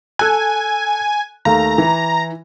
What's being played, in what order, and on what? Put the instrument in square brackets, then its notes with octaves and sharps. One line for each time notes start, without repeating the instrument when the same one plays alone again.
[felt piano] A4 F#6 [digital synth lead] G#5
[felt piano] D#2 A3 F5 [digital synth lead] A#5
[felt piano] E3